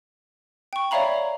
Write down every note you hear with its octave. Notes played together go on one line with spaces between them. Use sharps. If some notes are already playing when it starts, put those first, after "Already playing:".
G5 C#6
C#5 D5 E5 F5 A#5 B5